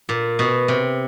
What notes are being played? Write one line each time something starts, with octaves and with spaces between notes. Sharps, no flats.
A#2
B2
C3